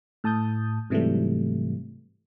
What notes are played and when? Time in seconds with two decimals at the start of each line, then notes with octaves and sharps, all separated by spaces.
0.24 A2 A5 D#6 G6
0.90 G#2 C3 E3 F#3 G3 A3